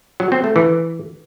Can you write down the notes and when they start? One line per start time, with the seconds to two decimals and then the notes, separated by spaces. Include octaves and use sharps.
0.20 F#3
0.32 C4
0.44 A3
0.56 E3